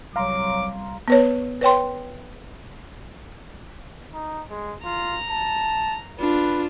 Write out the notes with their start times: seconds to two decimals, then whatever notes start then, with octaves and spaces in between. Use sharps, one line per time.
0.16 C2 F#3 F5 A#5 C6 D6
1.08 B3 B4 C#5
1.61 B4 C#5 G5 C6
4.14 D#4
4.50 G#3
4.85 F4 A#5
5.30 A5
6.19 D4 F4 B4